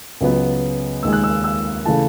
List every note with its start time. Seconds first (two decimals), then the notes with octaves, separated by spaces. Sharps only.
0.21 C#2 C#3 F#3 B3
1.03 D#2 D#3 G#3 E6
1.13 F#6
1.24 E6
1.44 E6
1.85 C#3 E3 A3 A5